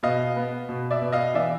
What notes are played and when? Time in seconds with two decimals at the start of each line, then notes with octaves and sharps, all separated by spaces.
0.03 B2 D#5 F5
0.36 B3
0.69 B2
0.91 D5 E5
1.02 B2
1.12 D#5 F5
1.34 E3 D5 E5